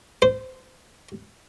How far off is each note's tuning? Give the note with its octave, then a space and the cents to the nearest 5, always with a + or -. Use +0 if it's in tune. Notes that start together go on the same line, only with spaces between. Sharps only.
C5 -20